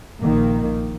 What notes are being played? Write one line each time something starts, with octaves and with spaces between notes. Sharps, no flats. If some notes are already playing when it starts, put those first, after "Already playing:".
A#1 D#3 A#3